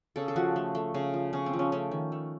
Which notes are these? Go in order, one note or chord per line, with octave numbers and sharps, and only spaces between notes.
C#3 A4
A4
F3 F#4
A3
A3
C#3
F3
C#3 C#4
C4
F3
C#4
A3 C#4
D#3
A3